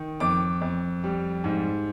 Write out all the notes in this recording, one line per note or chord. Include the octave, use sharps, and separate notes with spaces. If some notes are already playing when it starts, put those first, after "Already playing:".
Already playing: D#3
F2 D6
F2
G3
G#2